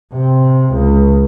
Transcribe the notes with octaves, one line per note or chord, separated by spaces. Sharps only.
C3
C#2